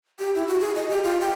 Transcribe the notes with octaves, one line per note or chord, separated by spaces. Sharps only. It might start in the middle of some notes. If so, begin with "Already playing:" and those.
G4
E4
F#4
G#4
D#5
G4
F4
G5